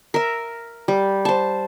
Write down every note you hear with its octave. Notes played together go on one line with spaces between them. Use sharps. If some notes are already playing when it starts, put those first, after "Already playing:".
A#4 E5
G3
C5 A5